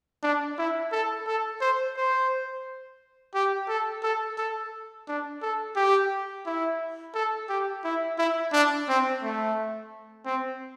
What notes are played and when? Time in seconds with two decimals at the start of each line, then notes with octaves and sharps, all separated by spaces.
0.23 D4
0.58 E4
0.92 A4
1.26 A4
1.61 C5
1.97 C5
3.34 G4
3.68 A4
4.03 A4
4.38 A4
5.08 D4
5.42 A4
5.76 G4
6.46 E4
7.14 A4
7.49 G4
7.84 E4
8.18 E4
8.52 D4
8.88 C4
9.23 A3
10.25 C4